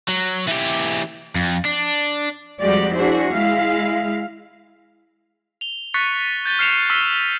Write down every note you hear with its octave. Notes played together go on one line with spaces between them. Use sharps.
F#3
E3 G4
F2
D4
F2 G3 G#3 F#4 G4 D5
D4 E4 F#4 G#4 C5
G#3 E4 F5
F7 G7
C#6 F#6 A6 B6 C#7
G6 A6 D#7 G7
F6 A6 C7 C#7 E7 F7
C#6 E6 F6 B6 D#7 G7